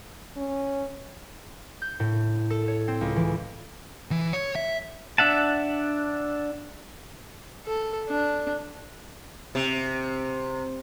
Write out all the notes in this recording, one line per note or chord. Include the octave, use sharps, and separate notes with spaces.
C#4
G6
A2
A4
C#5
C4
C#2
E3
E3
C#5
E5
D4 E5 F#5 A5
A4
D4
C3